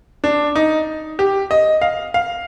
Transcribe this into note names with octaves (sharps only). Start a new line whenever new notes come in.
D4
D#4
G4
D#5
F5
F5